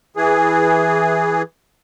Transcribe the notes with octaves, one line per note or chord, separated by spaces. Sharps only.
E3 G#4